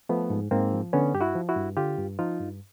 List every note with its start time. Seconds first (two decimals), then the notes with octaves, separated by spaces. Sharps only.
0.09 F3 A3 B3
0.30 G#2
0.51 G#2 A#3 C4
0.73 F3
0.93 D3 B3 C#4
1.14 G2 G4
1.21 E4 F#4
1.35 F3
1.49 E4 F#4
1.56 G2
1.77 D3 F4 G4
1.98 G2
2.19 F3 D#4 F4
2.40 G2